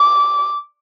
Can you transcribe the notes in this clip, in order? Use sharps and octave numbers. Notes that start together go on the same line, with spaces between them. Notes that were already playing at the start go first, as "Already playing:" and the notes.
Already playing: D6